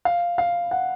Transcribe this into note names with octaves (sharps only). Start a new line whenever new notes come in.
F5
F5
F#5